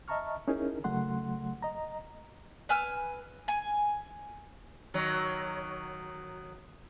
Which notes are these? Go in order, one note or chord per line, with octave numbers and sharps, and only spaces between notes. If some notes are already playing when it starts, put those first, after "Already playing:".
D#5 E5 A5 A#5 C#6 F6
C#4 D#4 E4 G#4 A#4
C#3 F#3 A3 F#5 C6
D#5 A#5
B4 G#5 E6 F6
G#5
D#3 F#3